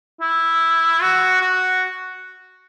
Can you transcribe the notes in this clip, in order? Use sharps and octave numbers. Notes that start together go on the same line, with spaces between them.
E4
F#4
F#4